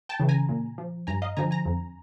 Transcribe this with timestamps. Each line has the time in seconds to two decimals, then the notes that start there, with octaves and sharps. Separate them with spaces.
0.09 G5 A5
0.20 C#3 E3
0.29 G#5 A#5
0.49 A#2
0.78 F3
1.07 G2 G#5 A#5
1.22 D#5 F5
1.37 D3 F3 G#5 A#5
1.51 G#5 A#5
1.65 F2